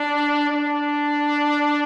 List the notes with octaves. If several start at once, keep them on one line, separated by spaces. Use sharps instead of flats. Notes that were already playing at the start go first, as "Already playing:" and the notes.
Already playing: D4
D4